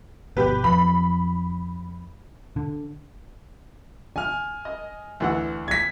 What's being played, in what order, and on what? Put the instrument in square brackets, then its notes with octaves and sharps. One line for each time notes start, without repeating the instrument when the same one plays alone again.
[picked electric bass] G1 B2 [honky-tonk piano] G4 B4
[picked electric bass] F2 [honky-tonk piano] B5
[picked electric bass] D3
[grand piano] G#5 F6
[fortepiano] D#5
D2 E3 F#5
[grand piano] G#6 B6